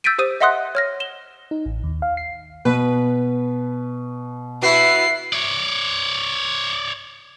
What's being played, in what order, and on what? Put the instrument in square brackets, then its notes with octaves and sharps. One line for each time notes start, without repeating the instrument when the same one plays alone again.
[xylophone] E6 G6 A6 B6 D7 D#7
G4 C5 D#6 D#7
D#5 E5 F#5 C6 D#6 F#6
C#5 F6 A#6
E7 G7
[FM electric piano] D#4
A1
D#2
F5
C7
[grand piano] B2 [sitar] B4
[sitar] B3 F#4 [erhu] E4 [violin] C7
[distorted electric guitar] C#5 D5